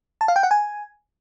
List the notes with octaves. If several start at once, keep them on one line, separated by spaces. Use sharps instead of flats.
A5
F5
G5
F#5
G#5